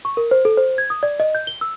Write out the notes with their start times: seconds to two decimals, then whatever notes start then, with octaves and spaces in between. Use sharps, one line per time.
0.05 C#6
0.17 A#4
0.31 C5
0.45 A4
0.57 C5
0.78 G#6
0.90 D#6
1.03 D5
1.20 D#5
1.35 G6
1.47 G7
1.61 E6